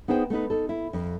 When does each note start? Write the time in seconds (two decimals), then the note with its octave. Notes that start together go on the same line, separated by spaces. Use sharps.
0.08 B3 D#4 G#4 C5 G5
0.30 A3 B3 D#4 B4
0.50 D#4 A4
0.69 E4
0.93 F2